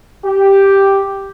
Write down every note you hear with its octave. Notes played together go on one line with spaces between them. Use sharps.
G4